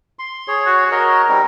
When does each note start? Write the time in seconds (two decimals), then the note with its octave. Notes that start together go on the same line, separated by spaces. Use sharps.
0.19 C6
0.48 G#4 C#5
0.66 F#4
0.92 F#4 A#4 C#5 D#5
1.29 G3 C4 D#4